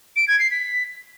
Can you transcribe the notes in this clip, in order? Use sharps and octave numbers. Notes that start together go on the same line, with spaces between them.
D7
G#6
C7
B6